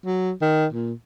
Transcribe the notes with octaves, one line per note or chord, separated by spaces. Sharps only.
F#3
D#3
A#2